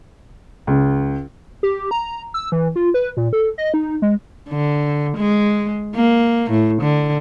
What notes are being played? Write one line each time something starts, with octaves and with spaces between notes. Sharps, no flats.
C#2
G4
A#5
E6
E3
F4
B4
A#2
A4
D#5
D#4
G#3
D3
G#3
A#3
A2
D3